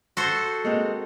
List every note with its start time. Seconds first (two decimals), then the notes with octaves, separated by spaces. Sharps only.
0.17 F#4 A4 C5
0.65 G#3 A#3 C4